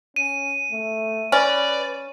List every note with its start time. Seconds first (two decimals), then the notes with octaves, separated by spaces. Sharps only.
0.16 C#4 D#7
0.71 A3
1.32 C#4 B4 D5